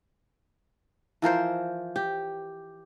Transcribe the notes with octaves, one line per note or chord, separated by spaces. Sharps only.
E3 F3 A#4 C5
G4